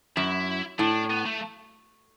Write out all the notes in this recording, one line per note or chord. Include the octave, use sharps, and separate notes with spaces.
F#2 E4
A2 D4
B3
A3